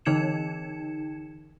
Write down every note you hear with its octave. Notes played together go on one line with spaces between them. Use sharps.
D3 E3 D#4 G#6 C#7 E7